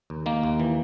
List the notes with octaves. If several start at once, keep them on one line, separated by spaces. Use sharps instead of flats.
D#2
D#3 A#3
D#2
E3